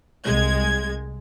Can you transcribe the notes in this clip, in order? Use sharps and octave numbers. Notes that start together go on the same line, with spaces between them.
C2 G#3 G#6